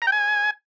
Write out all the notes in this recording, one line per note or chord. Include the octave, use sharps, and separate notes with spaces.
A#5
G5
G#5